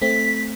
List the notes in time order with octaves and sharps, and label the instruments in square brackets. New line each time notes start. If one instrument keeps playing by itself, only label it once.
[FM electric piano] A3 C4 [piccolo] B6